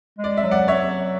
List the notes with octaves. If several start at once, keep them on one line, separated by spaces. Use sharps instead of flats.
G#3
D5
E5
F#3
D5 F#5
C#5 E5